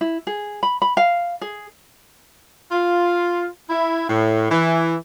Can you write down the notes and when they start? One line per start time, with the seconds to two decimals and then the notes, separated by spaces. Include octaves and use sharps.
0.01 E4
0.27 G#4
0.63 B5
0.82 B5
0.97 F5
1.41 G#4
2.72 F4
3.70 E4
4.08 A2
4.50 E3